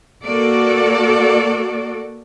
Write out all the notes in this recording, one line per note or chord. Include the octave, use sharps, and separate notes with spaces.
A#3 F#4 A4 D5